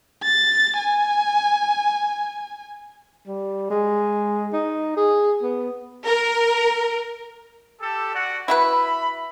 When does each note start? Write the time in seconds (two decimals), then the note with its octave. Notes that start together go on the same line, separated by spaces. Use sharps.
0.23 A6
0.79 G#5
3.28 G3
3.70 G#3
4.53 D#4
4.97 G#4
5.42 B3
6.04 A#4
7.81 G4 A4
8.14 F#4 D5 F#5
8.48 E4 F#4 B4 E5 B5